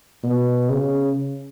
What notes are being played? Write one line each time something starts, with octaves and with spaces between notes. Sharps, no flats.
B2
C#3